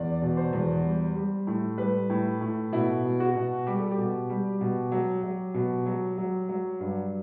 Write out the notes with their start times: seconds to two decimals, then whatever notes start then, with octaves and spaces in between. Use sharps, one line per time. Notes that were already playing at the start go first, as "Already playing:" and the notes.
Already playing: E2 D5
0.22 B2
0.37 C5
0.53 E2
0.84 G3
1.15 G3
1.47 A2
1.78 G3 B4
2.10 A2
2.41 A2
2.72 B2 E4
3.04 B2
3.20 F#4
3.35 B2
3.67 G3 G4
3.79 A4
3.91 G4
3.98 B2
4.30 G3
4.61 B2
4.92 F#3
5.23 F#3
5.54 B2
5.86 F#3
6.18 F#3
6.49 F#3
6.80 G2